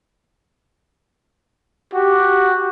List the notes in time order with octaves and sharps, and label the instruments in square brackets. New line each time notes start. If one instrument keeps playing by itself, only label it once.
[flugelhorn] F#4 [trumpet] G4